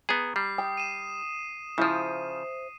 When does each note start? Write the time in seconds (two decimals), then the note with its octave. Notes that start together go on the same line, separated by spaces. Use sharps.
0.09 B3 G#4 A#5
0.36 G3 C7
0.58 G5 D#6
0.77 D#7 E7
1.78 C#3 F3 E4 C5